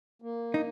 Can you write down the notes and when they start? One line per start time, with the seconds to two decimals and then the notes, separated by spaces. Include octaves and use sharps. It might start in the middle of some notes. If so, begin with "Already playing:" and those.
0.22 A#3
0.54 D#4